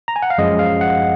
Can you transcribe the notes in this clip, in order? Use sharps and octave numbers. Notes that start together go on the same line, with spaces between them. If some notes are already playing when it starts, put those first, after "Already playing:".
A#5
G#5
F#5
F5
F#2 F3 G#3 D#5
F5
F#5